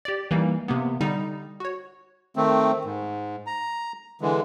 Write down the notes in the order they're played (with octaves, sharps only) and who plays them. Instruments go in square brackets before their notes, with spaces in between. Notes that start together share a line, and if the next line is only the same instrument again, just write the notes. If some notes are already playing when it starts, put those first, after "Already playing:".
[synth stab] G4 D5
E3 G3 A#3 D#4
C3 A#3 B3
D3 G3 D#4
F#4 C#5
[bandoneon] D#3 A3 C4
G#2
A#5
D3 E3 G#3